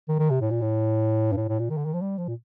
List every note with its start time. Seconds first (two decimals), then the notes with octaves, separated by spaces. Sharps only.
0.09 D#3
0.19 D#3
0.30 C3
0.41 A2
0.51 A#2
0.61 A2
1.32 G2
1.37 A2
1.49 A2
1.59 A#2
1.70 D#3
1.77 D3
1.86 D#3
1.94 F3
2.02 G3
2.18 F3
2.28 A#2